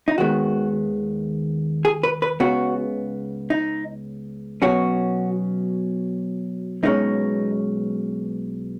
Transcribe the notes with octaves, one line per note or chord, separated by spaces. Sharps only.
D#4
D#2 D#3 G#3 B3 F#4
G#4
B4
B4
C#2 C#3 B3 F#4
D#4
B2 F#3 C#4 F#4
B1 B2 G#3 C#4 D#4